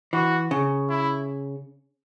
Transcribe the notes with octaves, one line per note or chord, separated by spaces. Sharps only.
E3 F#4
C#3
E4